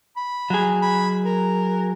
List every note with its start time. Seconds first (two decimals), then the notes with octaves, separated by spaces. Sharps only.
0.16 B5
0.50 F#3 G#4
0.81 B5
1.24 A#4